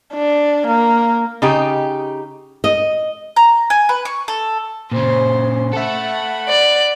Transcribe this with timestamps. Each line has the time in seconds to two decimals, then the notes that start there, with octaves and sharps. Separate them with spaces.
0.14 D4
0.68 A#3
1.42 C#3 D#4 G4
2.64 D#5
3.36 A#5
3.70 G#5
3.89 B4
4.05 C#6
4.28 A4
4.92 A#2 C#3 C5
5.73 A4 E5 F#5 B5
6.49 D5